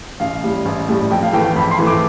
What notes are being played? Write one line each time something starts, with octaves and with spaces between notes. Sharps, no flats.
A1 F5
A2 G3
A1
A2 G3
F2 G5
F5
E3 A3 G5
G5
F2 B5
C6
E3 A3
D6